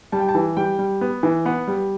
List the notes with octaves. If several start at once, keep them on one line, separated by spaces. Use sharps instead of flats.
G3 A5
G5
A5
E3
G3 G5
G3
B3
E3
B3 F#5
G3